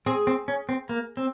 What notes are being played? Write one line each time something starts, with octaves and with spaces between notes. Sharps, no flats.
C4 G#4
C4
C#4
C4
A#3
C4